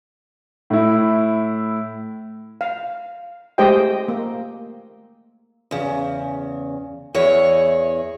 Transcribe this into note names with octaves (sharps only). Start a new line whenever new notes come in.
A2 E4
F5
G#3 A3 G4 C5 D#5 G5
A#3
E2 C#3
E2 E4 G#4 C#5